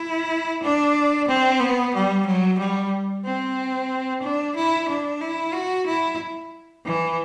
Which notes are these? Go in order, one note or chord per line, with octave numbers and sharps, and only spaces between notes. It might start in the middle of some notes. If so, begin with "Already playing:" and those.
Already playing: E4
D4
C4
B3
G3
F#3
G3
C4
D4
E4
D4
E4
F#4
E4
E3